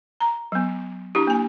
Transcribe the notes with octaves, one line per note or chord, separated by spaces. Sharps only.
A#5
F#3 B3
D4 E4 G4
A#3 G#5